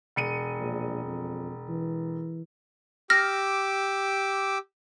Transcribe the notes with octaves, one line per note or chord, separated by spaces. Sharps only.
E1 C#7 D#7
A#1
F2
E3
G4 D6 E6 F6 A#6